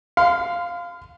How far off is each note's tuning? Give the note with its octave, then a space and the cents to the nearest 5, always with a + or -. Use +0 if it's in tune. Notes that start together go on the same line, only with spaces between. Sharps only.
F5 +0 C6 -45